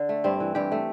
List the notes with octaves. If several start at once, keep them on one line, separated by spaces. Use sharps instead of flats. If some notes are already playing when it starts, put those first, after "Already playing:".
Already playing: D3
A3
G2 C4
E3
G2 G4
A3